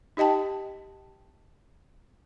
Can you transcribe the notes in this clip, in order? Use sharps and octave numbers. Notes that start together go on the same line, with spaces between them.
D#4 G4 D#5 G5 A5